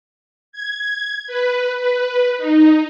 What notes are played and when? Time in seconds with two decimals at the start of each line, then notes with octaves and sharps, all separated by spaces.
0.52 G#6
1.27 B4
1.78 B4
2.38 D#4